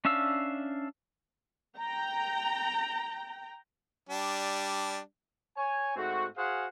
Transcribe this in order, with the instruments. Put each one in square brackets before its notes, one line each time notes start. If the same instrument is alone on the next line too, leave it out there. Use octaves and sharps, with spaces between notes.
[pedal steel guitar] C#4 D4 E5 F5 E6
[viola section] G5 A#5
[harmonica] G3 D4
[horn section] C#5 G#5
G#2 A3 C4 F#4
F#4 G#4 C5 F5 F#5 G#5